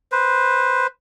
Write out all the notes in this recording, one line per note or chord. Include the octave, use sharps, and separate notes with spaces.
B4 C5